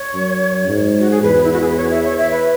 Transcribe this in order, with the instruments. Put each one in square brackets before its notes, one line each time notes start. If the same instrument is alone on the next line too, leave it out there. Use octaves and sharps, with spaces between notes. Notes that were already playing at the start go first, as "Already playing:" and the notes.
Already playing: [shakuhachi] C#5
[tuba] F#2
G#2
[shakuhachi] F#4
G#4
[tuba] E2 [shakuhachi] B4
[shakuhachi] E4
F#4
G#4
B4
C#5
E5
C#5
E5
B4